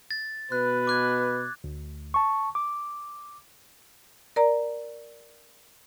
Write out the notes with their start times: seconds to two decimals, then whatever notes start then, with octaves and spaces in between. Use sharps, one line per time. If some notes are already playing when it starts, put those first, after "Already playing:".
0.11 A6
0.52 B2 B4 F#6
0.87 D6 F#6 G#6
1.64 D2
2.14 A5 C#6
2.55 D6
4.36 A#4 D5 A#5